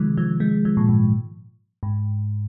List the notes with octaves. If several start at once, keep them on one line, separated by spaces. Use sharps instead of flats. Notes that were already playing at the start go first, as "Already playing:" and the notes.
Already playing: C3 D#3 F3 G#3
F3
G#3
F3
A#2
G#2
G#2